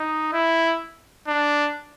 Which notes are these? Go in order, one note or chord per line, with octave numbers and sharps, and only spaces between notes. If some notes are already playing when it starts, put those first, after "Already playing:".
Already playing: D#4
E4
D4